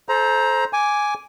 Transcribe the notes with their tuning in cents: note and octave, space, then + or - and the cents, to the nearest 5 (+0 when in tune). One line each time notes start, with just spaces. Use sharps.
A4 -25 C5 +0 A#5 +15
G#5 +0 D6 -5